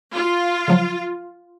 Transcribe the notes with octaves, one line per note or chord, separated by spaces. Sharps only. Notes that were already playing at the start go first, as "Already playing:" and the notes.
F4
C#3 F3 F#3